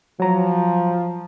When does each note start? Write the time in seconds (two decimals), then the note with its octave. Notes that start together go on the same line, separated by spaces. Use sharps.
0.20 F3 F#3 A#5